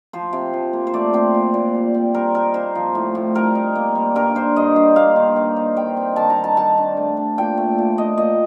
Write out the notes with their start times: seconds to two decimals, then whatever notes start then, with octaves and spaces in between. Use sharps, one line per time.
0.13 F3 C5
0.33 C3
0.54 F3
0.73 A#3
0.87 C5
0.94 A3 D5
1.13 C4 C5
1.34 A#2
1.54 A#2
1.75 G3
1.94 C4
2.15 G3 A#4
2.35 D#4 A#4
2.54 A#3 C5
2.75 F3
2.95 A2
3.15 A2
3.35 G3 A#4
3.55 D#4
3.75 A#3
3.95 G3
4.15 G2 A#4
4.35 G2 C5
4.56 G2 D#5
4.76 G2
4.96 A#3 F5
5.16 D#3
5.36 D#3
5.56 D#4
5.76 G3 G5
5.97 C4
6.16 D#3 A5
6.30 A#5
6.36 D#3
6.44 A5
6.57 D#3 A5
6.78 D4
6.97 A3
7.17 D4
7.38 A#2 G5
7.57 A3
7.78 A#2
7.98 A#2 D#5
8.17 A#2 D#5